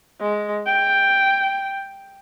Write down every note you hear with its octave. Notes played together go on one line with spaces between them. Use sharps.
G#3
G5